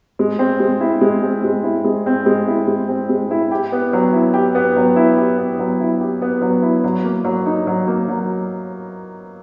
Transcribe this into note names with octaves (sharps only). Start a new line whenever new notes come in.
G#3
C4
G#3
E4
G#3
C4
G#3
E4
G#3
C4
G#3
E4
G#3
C4
G#3
E4
G4
B3
F#3
E4
G4
B3
F#3
E4
G4
B3
F#3
E4
G4
B3
F#3
E4
F#3
A#3
F#3
D#4
F#3
A#3
F#3